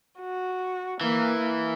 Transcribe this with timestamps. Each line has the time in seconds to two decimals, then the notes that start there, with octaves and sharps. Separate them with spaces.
0.20 F#4
1.01 E3 A#3
1.42 A#3